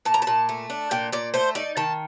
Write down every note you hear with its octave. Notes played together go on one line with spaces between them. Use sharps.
A#2 A5
A#5
A5
A#2
A3
D4
A#2 G5
A#2 D5
A3 C5
D#4 D5
D#3 A5